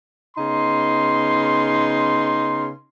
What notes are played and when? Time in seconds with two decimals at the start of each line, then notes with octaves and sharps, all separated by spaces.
0.37 C#3 B3 D#4 C6